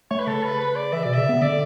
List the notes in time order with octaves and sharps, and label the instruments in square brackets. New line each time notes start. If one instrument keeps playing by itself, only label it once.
[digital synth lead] A3 [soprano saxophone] C#5
[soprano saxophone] B4
[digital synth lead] C#3 [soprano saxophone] A4
[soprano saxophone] B4
B4
D5
[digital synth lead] E3 [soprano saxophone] E5
[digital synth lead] B2 [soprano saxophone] D5
[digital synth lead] C#3 [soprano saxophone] E5
[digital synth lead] B3
[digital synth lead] D3 [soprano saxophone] D5